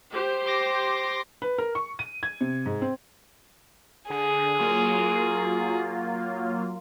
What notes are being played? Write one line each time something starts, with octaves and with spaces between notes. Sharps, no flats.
G4 C5
C6 D6 A#6
B4
A#4
C#6
D#7
G#6
C3
G#2
C4
D3 G#4
F#3 A#3 F4